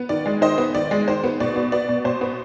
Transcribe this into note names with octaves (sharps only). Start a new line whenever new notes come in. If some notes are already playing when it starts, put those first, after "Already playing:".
Already playing: B3
D#3 D5
G#3
D#3 C5 D#5
B3
D#3 D5
G#3
D#3 C5
B3
B2 D5
B3
B3 D5
B2
B2 C5
B3